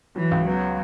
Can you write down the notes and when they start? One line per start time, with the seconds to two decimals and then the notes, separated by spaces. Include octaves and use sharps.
0.16 E3 F#3
0.31 C#2
0.47 F#3 B3